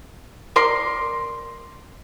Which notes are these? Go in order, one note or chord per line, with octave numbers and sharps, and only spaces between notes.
A#4 D5 C6